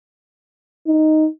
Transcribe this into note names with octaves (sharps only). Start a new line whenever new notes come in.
D#4